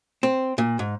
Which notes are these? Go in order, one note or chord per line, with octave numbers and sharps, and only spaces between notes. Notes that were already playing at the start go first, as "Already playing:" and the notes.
C4
A#2
G#2